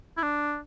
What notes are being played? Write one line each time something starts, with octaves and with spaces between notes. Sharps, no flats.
E4
D4